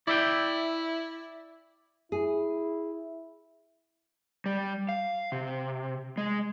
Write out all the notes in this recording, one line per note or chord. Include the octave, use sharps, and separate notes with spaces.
E4 D5 E5 G5
E4 G#4
G3
F5
C3
G#3